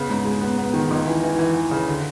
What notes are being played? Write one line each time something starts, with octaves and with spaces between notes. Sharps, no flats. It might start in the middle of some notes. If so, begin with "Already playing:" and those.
Already playing: C#3 B3
G#2
G#3
B3
B3
D#3
C#2
E3
E3
E3
E3
C#3
D3